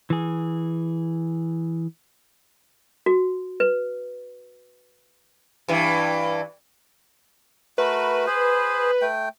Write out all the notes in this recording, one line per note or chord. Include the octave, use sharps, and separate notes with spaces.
E3 G#4
F#4
B4
G2 E3
A3 F#4 A#4 B4
G#4 C5
A3 G5